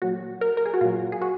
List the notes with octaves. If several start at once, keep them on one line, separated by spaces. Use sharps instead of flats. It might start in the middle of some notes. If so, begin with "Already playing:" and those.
A#2 F#3 F#4
A#4
A#4
G#4
F#4
A#2 F#3 F4
G#4
F#4